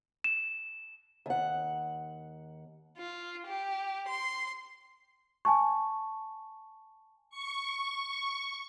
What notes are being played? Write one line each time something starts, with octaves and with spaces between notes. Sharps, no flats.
E7
D#2 F#5
F4
G4
C6
G#5 A5 C#6
C#6